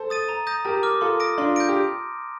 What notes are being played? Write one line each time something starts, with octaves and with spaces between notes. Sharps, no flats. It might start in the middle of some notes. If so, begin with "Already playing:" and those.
Already playing: A4 C5
D#6 A6 D#7
A#5
D#6 G6 A#6
G4 A#4 A5
D6 F6
F4 A4 C6
D#6 A#6 D7
D4 F4 C6
G6 A#6 D7
G4